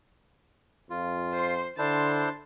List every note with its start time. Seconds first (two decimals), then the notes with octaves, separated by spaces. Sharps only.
0.90 F2 F4
1.33 C5 C6
1.79 D3 D4 E4 C5 A5 C6